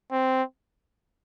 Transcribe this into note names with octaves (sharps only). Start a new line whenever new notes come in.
C4